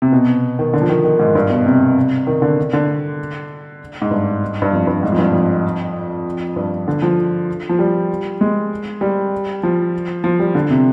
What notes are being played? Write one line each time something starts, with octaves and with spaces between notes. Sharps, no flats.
C3
B2
D#3
D3
F3
D#3
D#3
G#2
G2
B2
C3
D#3
D3
D3
G#2
G2
G2
F2
G2
G#2
F2
G2
F2
G2
D3
F3
F3
G3
G#3
G3
F3
F3
G3
D3
C3